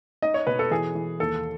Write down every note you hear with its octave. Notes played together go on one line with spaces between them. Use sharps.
D#4 D#5
C#5
B2 B4
A4
E3 G#4
E3
D#2 A4